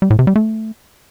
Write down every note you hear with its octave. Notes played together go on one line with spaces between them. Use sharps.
G3
A2
C3
G3
A3